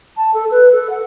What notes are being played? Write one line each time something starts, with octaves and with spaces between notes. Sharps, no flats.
A5
A4
B4
A4
F#5